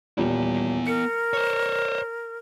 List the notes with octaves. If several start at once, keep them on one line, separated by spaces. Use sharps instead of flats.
D#1 G3 B3 E4
A#4 C#7
C5 C#5